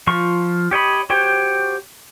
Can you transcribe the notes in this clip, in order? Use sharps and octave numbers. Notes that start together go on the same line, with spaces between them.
F3 F4 C#6
G4 C#5 D#5 B5
F#4 G4 C5 C#5 G5